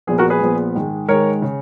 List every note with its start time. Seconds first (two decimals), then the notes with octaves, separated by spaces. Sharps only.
0.07 A#1 A#2 F3 B3 G#4
0.18 F#4 A#4
0.30 G#4 B4
0.41 A#1 A#2 F3 B3
0.75 G#2 D#3 G#3
1.09 G#2 D#3 G#3 A#4 C#5
1.42 C#3